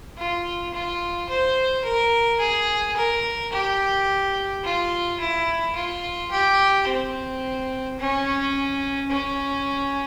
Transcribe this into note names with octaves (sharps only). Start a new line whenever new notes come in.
F4
F4
C5
A#4
G#4
A#4
G4
F4
E4
F4
G4
C4
C#4
C#4